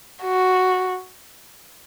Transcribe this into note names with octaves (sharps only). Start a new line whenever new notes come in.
F#4